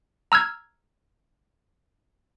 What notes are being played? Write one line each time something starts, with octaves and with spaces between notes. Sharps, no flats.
A#5 E6 F6 G#6